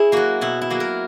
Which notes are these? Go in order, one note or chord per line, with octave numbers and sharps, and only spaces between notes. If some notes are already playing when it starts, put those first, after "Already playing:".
Already playing: C#4 E4 G#4
F#3 A#3 F#4
B2 E4
E4
F#3 A#3
A#4